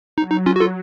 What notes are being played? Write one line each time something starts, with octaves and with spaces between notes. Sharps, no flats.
F#3 D#4
D#4
C#4 F4
F#4
F4 A4